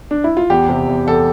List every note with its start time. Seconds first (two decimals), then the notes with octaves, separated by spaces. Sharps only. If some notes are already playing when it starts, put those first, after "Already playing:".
0.11 D4
0.24 E4
0.37 F4
0.50 E2 G4
0.69 C3
0.88 E2
1.06 E2 A4